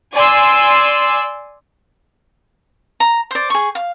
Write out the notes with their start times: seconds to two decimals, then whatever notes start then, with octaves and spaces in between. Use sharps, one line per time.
0.14 D5 G#5 C6 E6
3.00 A#5
3.31 C5 D5
3.50 G#4 C#6
3.75 F5